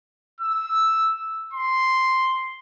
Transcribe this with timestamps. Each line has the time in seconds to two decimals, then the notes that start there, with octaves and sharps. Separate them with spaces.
0.41 E6
1.54 C6